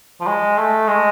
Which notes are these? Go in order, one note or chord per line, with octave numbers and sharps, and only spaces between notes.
F3
G#3
A3
G#3